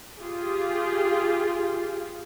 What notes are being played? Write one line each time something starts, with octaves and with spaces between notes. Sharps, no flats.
F4 G4 G#4